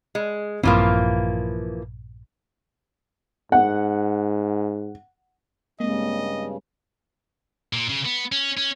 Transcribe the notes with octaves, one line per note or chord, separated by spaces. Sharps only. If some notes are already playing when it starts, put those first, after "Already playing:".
G#3
A#1 G2 E3 F3 A#3 C4
G#2 F#5
G2 C#3 G#3 A#3 C4 D#5
A#2
C#3
B3
C#4
C#4